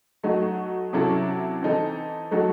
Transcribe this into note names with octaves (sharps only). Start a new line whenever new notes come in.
F#3 A3 D#4 F#4
C3 F#3 C#4 E4 A4
E3 C4 D#4 A4
F#3 A3 D#4 F#4 A4